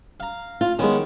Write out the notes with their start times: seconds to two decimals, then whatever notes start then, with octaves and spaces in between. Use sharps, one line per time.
0.20 F5 A#5
0.61 F4
0.79 D#3 G#3 B3 C#4